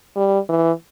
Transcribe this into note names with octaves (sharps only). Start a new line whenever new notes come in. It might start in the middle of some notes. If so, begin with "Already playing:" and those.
G3
E3